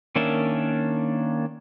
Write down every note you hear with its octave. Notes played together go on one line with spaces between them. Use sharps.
D#3 A#3 C#4 D4 E5